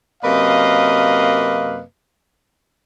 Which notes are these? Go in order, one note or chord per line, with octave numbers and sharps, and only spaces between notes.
F#2 C3 A#3 B4 D#5 F5